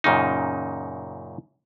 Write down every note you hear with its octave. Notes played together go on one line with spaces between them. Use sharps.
F#2 A#2 C#3 D#4